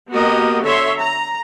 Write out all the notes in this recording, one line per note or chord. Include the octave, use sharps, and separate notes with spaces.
A#3 B3 F#4 G4 A#4 D#5
D3 C#5 E5 C6
A#5